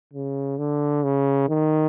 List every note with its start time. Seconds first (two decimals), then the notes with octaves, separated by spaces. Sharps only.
0.13 C#3
0.58 D3
1.04 C#3
1.49 D#3